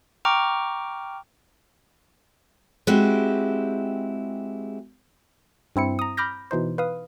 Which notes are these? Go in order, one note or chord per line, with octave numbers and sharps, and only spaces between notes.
G5 A#5 C#6 D6 F6
G#3 C4 E4 F#4 G4
G2 C4 E4 C#7
A#5 D#6
B5 D6 F6 G6 A#6
B2 E3 D#4 C5
B4 F5 D#6